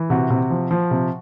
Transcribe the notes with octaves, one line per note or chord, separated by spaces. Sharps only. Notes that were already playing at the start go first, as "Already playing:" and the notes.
Already playing: E3
C3 F#4
C3
F3
F3
C3